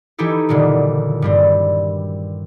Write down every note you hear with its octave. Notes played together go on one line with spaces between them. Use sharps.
E3 D#4 E4 G4 A4
F#1 A#2 D3 D#3
G2 G3 C4